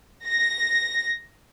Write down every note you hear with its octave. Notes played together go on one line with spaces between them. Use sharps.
A#6